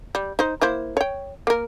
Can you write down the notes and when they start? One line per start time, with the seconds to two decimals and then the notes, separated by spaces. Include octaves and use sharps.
0.15 G3
0.39 D#4 C5
0.61 A#3 E4 C5
0.97 C#5 G5
1.47 A#3 A#4